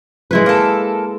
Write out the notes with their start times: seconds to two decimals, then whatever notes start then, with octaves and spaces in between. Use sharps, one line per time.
0.31 G#3 E4 B4
0.46 A#3 A4